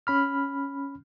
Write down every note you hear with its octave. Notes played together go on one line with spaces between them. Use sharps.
C#4 B5 F6